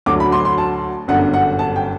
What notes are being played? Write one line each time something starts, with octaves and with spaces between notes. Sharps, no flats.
D2 D3 F#3 D6
B5
C6
C6
A5
G1 F#2 D3 F#5
F#5
A5
G5